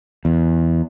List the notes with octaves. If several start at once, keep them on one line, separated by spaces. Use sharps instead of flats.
E2